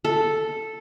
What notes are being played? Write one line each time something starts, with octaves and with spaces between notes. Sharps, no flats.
A4